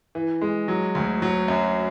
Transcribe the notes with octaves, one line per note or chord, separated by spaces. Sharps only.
E3
G#3
F#3
D2
F#3
F#2